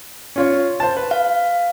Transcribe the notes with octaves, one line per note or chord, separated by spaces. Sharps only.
C#4 F4 C#5
C5 A5
B4
F5